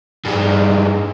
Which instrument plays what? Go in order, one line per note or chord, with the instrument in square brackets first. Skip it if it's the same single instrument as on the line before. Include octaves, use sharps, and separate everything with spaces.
[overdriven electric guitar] G2 G#3